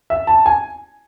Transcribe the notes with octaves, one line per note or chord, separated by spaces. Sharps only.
E5
A5
G#5